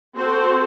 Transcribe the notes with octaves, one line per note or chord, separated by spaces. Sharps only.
C4 F#4 A4 C5